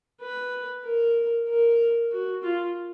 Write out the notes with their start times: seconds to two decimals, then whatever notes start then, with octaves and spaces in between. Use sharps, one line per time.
0.21 B4
0.84 A#4
1.48 A#4
2.12 F#4
2.43 F4